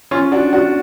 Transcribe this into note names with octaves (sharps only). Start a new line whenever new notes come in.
C#4 F4
D4 F#4
D4 F#4